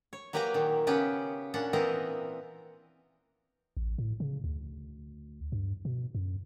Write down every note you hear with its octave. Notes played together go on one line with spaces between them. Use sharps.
C#5
F#3 A#3 G4 B4 G#5 A#5
A#2 D#3
C#3 B3 C#4 G4 B4
A#2 C#4 D4 F#5
A#2 E3 B3 C4 A#4 D#5
A1
A2
C#3
D2
G2
B2
F#2